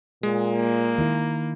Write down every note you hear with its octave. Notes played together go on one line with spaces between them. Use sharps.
A#2 G#3
A#3
D#3 E4